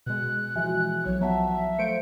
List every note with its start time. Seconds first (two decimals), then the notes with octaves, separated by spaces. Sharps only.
0.06 B2 G#3 F#6
0.56 E3 F3 F#4 E5 G#5
1.05 B1 F#3 C#5
1.21 F3 B3 C#5 E5 F#5 A5 A#5
1.78 A3 C5 F5 C#7 D7